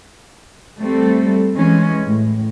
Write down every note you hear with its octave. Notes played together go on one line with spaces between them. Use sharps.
G3 A3 C4 A4
E3 G#3 C#4
A2